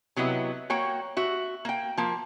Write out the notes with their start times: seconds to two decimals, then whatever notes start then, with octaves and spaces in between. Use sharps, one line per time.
0.16 C3 F#3 B3 E4 D#5
0.70 A#3 F#4 C#5 G5
1.17 F#4 E5
1.65 A#3 G5
1.97 F3 A#3